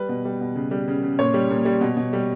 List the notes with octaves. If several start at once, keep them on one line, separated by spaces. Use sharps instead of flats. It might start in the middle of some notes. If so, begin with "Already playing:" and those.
Already playing: G3 B4
B2
G3
B2
C#3
G3
C#3
C#3
A#2 C#5
G3
A#2
G3
B2
B2
G3